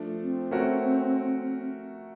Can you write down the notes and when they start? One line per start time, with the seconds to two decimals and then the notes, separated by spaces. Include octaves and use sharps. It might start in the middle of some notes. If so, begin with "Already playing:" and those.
Already playing: F3 A3 D4
0.22 C4
0.51 A3 C#4 F#4 A#4